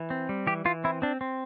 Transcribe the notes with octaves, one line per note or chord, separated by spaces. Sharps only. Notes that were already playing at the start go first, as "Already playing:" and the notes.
Already playing: E3
C4
G3
E3 G4
E3 F4
C4 E4
C4 D4
C4